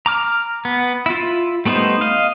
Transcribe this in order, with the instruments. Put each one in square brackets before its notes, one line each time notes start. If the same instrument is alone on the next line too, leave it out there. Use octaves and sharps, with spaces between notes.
[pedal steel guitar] A#5 D6 F6
B3
E4 F4
G3 A3 B3 D#4 C5
D#5 F5